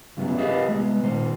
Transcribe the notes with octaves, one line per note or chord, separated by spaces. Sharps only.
G2 C#3 F#3 B3 E4
G4 G#4 A#4 B4 D#5 F5
C2 G#3 B3
A#2 D#3 C5